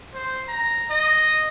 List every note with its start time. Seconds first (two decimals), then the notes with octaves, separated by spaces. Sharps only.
0.14 C5
0.48 A#5
0.90 D#5